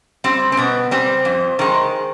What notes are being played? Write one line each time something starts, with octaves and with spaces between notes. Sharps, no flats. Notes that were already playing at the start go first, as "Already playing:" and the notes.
G3 C4
C4
B2 B3
G3 C4
F2
D#3 G#3